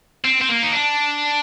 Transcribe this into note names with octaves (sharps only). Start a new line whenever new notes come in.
C4
C4
A#3
D#4
D4